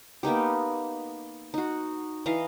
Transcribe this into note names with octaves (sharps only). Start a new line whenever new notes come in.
A#3 B3 D#4 G4
D#4 F#4
E3 D#5 F5 A#5